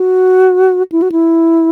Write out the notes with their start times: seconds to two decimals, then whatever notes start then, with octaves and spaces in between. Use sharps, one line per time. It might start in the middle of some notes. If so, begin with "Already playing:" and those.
Already playing: F#4
0.92 E4
1.02 F#4
1.12 E4